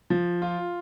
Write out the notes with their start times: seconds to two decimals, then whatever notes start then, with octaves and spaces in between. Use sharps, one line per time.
0.10 F3
0.42 F4